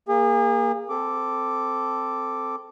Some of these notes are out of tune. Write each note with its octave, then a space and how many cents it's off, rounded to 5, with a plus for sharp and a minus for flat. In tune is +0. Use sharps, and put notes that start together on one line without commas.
A#3 +0 G#4 -35
C4 -10 A4 +0 D6 +0